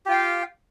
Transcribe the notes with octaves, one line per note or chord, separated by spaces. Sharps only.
F4 G4 F5 G5